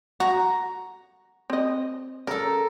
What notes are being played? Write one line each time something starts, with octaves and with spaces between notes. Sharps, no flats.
F#4 A#5
C4 D#5
C#3 A4 A#4